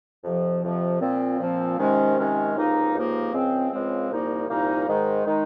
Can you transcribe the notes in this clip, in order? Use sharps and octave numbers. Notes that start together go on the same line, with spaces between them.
F2 C3 F3
F2 C3 F3
A#2 F3 C4
A#2 F3 C4
C3 D#3 G#3 C#4
C3 D#3 G#3 C#4
C#2 C3 F3 A#3 D#4
C#2 C3 F3 A#3 D#4
C#2 C#3 F3 G#3 C4
C#2 C#3 F3 G#3 C4
C2 A#2 F3 A#3 D#4
C2 A#2 F3 A#3 D#4
G#2 D#3 G#3 D#4
D#3 G#3 D#4